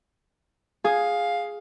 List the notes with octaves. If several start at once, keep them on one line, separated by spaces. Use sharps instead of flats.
G#4 F5